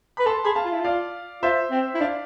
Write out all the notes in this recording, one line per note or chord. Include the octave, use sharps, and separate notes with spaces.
B4 B5
A4 A5 C6
G#4 B5
F5 A5
F4
E4
F4 D5 F5
F4 C5 E5
C4
E4
D4 D5 F5